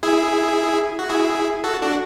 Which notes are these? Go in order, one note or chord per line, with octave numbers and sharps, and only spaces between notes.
E4 G#4
F#4
E4 G#4
F#4 A4
D4 F#4